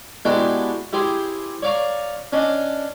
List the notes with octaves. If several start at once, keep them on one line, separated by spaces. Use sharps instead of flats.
G#3 B3 D4 E4 F#4 G4
E4 G4 G#4 C5
C#5 D5 F5 A#5 C#6
C#4 D4 D#5